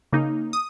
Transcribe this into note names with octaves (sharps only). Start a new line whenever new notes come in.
C#3 A#3 D#4
D#6